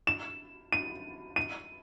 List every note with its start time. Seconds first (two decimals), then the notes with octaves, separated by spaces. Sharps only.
0.07 E7
0.72 D#7
1.36 D#7